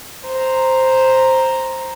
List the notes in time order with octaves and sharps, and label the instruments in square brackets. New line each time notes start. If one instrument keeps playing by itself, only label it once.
[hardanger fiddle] C5 A#5